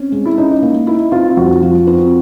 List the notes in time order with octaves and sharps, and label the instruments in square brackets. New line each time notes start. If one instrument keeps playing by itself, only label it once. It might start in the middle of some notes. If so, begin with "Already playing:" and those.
Already playing: [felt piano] C4 [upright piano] C#4
[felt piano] G#3
[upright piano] E4
[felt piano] C#4 [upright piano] D#4
[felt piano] A#3
[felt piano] D#4 [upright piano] E4
[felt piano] C4 [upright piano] F4
[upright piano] F4
[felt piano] F2 [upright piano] F#4
[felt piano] F3
C4